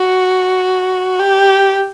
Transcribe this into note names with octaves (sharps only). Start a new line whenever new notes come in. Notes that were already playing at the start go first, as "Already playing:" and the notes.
Already playing: F#4
G4